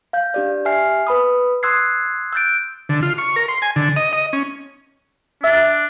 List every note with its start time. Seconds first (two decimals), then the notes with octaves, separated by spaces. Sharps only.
0.13 F5 G6
0.34 D4 G4 D5
0.65 G4 E5 G#5 F6 C7
1.07 B4 B5 D#6
1.63 C6 D#6 E6 F#6 G#6 C7
2.33 E6 F#6 G6 A6 D7
2.89 D3
3.03 F4
3.18 C#6
3.36 A#4
3.48 C6
3.62 G#5
3.76 D3
3.96 D#5
4.13 D#5
4.33 C#4
5.43 D4 E5 E6